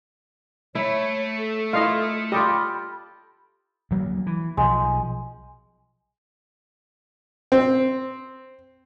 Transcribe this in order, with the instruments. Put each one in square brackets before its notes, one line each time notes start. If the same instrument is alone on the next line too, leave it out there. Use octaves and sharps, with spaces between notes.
[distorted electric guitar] A3 [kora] E4 [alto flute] C#5
[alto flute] A4
[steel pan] E4 D#5 F5 [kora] F4
[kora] F4 A4 D#5 [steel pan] G4 [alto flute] B5
[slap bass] D2 F#3 A#3
E3
[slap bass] B1 F3 [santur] G#3
[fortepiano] C4